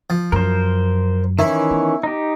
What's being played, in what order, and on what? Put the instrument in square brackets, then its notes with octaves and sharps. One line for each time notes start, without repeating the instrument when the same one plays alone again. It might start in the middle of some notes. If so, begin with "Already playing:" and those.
[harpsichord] F3
[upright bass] F#2 [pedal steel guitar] A#4 C5
[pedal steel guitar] D#3 E3 C#4 [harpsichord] E4
[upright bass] B3
[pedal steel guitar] D#4 G4